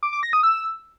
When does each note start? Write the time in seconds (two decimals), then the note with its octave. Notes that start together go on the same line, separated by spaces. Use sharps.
0.03 D6
0.13 D6
0.23 A#6
0.33 D#6
0.43 E6